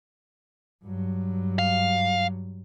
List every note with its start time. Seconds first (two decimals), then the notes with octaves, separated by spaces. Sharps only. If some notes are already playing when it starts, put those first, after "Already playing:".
0.84 G2 F#3
1.59 F5